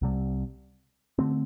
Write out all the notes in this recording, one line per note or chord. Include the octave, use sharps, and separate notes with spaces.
C2 C3 G3
D3 A3 C4